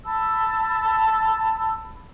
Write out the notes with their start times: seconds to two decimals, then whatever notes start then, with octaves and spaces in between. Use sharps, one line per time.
0.05 A5 B5 E6